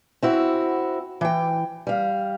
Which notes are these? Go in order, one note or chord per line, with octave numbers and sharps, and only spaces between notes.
C4 E4 F#4
E3 G5
G3 F5